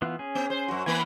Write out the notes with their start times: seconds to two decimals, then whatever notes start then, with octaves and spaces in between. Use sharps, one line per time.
0.02 E3 B3 F4
0.19 C#4 G#4
0.35 B3
0.50 C5
0.68 F#2 F#4
0.86 E3 A#3 B4 G#5